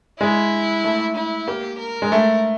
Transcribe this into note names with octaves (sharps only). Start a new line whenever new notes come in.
G#3 E4
A3
E4
A#3 G4
A#4
G#3
A3